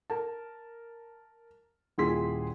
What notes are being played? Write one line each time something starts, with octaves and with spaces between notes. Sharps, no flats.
A#4 A5
D#1 A#2 E4 G#4 C6 B6